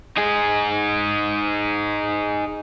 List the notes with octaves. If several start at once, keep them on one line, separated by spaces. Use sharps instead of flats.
D#4 G#4